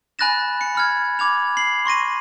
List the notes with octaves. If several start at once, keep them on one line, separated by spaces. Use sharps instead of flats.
G#5 B5 F#6 A6 A#6 E7
C#7
B5 F6 G#6
B5 D6 G#6 F7
C7 F#7
C6 C#6 A#6 D#7